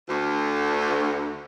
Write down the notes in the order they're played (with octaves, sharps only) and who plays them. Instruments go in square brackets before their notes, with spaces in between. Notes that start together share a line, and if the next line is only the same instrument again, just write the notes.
[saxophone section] D2